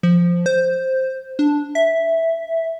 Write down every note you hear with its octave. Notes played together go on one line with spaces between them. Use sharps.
F3
C5
D4
E5